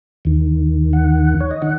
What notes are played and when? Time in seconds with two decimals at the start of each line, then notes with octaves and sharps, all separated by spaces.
0.25 D#2 D#3
0.93 F#5
1.40 C#5
1.51 D#5
1.62 D#3 F#5